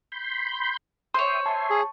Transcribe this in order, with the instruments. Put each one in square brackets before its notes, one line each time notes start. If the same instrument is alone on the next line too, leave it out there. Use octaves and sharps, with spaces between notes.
[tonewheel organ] B5 C6 G6
[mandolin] C5 C#5 [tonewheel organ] E5 G5 D#6 [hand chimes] C6
[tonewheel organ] E5 G#5 C6 [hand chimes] A5 C#6
[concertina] G#4